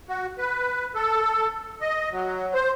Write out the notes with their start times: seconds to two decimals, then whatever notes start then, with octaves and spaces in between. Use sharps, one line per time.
0.09 F#4
0.38 B4
0.95 A4
1.81 D#5
2.12 F#3
2.54 C5